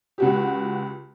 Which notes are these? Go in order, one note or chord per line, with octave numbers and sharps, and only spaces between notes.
C#2 F#4 G4